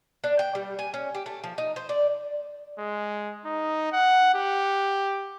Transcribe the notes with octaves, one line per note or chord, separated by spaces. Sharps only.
D4
G5
G3
G#5
C#4
G4
A3
F3
D#4
C5
D5
G#3
D#4
F#5
G4